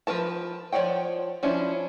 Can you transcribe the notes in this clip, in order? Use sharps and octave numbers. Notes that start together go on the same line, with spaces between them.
F3 D#4 A#4 B4 A5
F3 C#5 D5 F#5 G5
F3 C#4 D4 E4